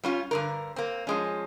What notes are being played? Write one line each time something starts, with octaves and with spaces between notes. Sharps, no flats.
G3 C#4 F4
G2 D3 A#4
A#3 C4
F3 G#3 C#4